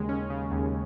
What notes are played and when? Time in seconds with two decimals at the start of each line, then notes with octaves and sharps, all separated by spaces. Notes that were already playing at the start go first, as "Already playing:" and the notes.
Already playing: D#2 C#3 G#3
0.09 C#4
0.30 C#3
0.52 D#2